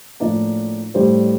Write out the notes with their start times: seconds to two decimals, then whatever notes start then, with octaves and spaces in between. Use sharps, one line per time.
0.20 A2 F3 A#3 D4 D5
0.94 A2 G3 D4 C5